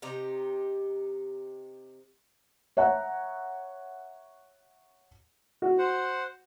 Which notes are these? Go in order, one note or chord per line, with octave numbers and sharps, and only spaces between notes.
C3 D#4 G4 A#5
C#5 E5 F#5 A#5
F#4
C5 F#5